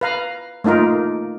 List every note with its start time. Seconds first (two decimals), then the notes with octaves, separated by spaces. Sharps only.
0.01 B4 F5 A#5
0.64 A3 A#3 D#4 F4 A#4